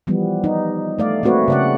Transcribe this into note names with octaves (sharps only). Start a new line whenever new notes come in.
E3 F3 G3 B3
D#4
A3 D5 F5
A3 A#3 C4 F#4 B4 C#5
C#3 D5 F#5